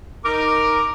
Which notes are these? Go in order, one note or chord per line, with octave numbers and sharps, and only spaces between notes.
D#4 A#4 D6